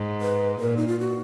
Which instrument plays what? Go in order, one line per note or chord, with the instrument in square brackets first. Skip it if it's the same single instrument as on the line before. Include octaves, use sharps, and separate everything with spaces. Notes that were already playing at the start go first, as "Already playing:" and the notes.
Already playing: [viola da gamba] G#2
[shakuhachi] B4
[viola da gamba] A#2 [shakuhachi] A#4
[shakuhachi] D#4
F4
F#4